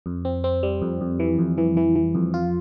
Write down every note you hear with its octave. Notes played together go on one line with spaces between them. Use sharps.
F2
C4
C4
G3
F2
F2
E3
F2
E3
E3
E3
F2
F4